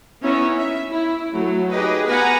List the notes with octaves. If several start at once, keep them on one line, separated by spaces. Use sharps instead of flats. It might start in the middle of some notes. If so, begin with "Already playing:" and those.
B3 C#4 D#4 E4 C#5 E5
E5
E4
F#3 A3
D#4 G4 G#4 B4 D#5
B3 B4 F#5 G#5 A#5